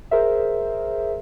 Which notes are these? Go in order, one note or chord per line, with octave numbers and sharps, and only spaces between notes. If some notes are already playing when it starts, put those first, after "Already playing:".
G#4 A#4 C5 E5